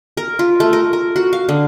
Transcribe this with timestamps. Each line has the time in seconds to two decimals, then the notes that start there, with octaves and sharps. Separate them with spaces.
0.17 A#4
0.39 F4
0.60 A3
0.73 A#4
0.93 A#4
1.16 F#4
1.33 F5
1.49 D3